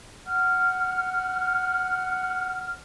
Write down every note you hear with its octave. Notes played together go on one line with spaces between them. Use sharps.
F#5 F6